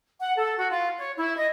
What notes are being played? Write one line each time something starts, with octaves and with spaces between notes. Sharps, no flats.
F#5
A4
F#4
F4
C#5
E4
D#5